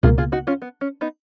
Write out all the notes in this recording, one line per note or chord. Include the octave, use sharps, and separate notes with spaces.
C#2 B2 A#3 F4 G#4
F4 G#4
D#4 F#4
C#4 F4
B3
C#4
B3 D#4